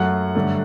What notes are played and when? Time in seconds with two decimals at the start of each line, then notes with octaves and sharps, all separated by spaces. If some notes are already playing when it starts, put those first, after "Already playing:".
Already playing: F#2 F#3 A3 F#5
0.35 G2 D3 F#3 A3